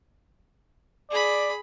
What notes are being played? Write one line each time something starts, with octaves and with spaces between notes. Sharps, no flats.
G#4 D5 B5